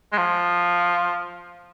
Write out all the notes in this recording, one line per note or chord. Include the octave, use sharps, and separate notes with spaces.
G#3
F3